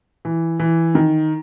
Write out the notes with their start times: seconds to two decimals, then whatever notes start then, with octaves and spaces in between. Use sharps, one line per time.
0.25 E3
0.60 E3
0.95 D#3